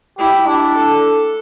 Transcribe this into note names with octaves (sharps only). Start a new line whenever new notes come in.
E4 G4
D4 E4
A4